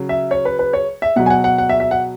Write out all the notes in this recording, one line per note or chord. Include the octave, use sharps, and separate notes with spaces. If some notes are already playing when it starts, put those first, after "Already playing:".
Already playing: C#3 F#3
E5
C#5
B4
B4
C#5
E5
B2 F#3 F#5
G#5
F#5
F#5
F#5
E5
E5
F#5